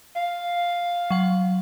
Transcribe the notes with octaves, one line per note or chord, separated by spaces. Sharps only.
F5
F#3 F#5